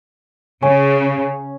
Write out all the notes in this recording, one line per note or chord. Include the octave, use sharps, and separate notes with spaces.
C#3 C#4